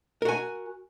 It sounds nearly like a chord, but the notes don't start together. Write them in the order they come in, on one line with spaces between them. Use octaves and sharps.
A#4 F#4 G#5